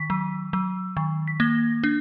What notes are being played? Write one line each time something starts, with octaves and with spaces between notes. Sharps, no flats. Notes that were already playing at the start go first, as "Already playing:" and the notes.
Already playing: D#3 B6
F#3
F#3
D#3
B6
A#3 A#6
D4